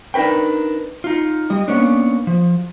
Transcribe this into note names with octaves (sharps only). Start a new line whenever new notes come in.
D4 D#4 A#4 B4 G5
D#4 F4
G3 D#5
A#3 B3 C#4 D4
F3